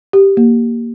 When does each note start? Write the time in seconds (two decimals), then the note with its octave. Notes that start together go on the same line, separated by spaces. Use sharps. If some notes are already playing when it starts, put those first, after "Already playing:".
0.13 G4
0.37 A#3